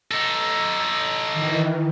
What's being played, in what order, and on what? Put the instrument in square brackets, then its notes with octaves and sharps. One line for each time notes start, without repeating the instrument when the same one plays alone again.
[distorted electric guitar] D#4 A4
[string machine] D#3 E3